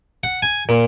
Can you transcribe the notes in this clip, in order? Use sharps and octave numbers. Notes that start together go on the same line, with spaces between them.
F#5
G#5
A#2